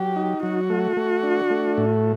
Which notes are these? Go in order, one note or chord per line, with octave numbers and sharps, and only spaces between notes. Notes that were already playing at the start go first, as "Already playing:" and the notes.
Already playing: F#3 G4
D#4
F#3 F#4
A3
A3
D4
A3
A2